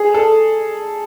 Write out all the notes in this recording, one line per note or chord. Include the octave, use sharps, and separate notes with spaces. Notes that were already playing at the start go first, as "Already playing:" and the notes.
Already playing: G#4
A4